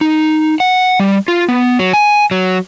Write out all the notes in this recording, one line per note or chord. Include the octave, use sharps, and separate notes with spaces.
D#4
F#5
G3
F4
B3
F#3
G#5
F#3